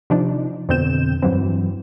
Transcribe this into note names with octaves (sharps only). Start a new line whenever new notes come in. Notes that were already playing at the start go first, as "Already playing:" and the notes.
C3 F3 D4 D#4
F2 B2 D3 C4 G6 E7
G2 E3 F#3 C4